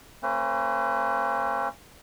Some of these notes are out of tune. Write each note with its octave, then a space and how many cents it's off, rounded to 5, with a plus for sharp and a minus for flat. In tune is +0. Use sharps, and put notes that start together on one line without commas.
A#3 -45 C#4 -35 B4 +40